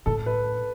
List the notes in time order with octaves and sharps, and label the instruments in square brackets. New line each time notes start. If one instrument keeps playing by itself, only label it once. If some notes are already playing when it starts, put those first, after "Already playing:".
[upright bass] A2 [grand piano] A4
[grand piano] B4